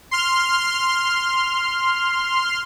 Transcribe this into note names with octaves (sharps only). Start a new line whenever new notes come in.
C6 F6